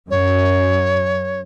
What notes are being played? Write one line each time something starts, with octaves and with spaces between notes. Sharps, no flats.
F#2 C#5